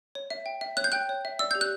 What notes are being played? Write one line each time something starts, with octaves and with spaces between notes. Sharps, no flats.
C#5
E5
G5
E5
C#5 F#6
G6
G5 F#6
C#5
E5
D5 E6
G4 G6
F#6